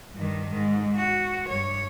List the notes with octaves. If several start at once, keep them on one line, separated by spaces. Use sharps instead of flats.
G2 D#3
G#2
F#4
G2 C#5